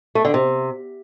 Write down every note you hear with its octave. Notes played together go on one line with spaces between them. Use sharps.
A3
D3
C3